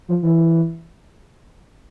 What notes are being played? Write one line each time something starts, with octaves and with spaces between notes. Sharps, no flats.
F3
E3